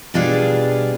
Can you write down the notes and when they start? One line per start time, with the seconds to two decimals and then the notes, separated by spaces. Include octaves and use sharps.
0.14 B2 G3 D4 F4 G#4